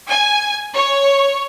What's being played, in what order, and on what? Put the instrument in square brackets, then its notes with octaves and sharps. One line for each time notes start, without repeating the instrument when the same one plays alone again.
[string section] G#5
C#5